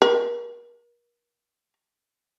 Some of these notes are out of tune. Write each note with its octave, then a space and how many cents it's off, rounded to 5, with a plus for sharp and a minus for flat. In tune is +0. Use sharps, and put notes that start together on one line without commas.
A#4 +40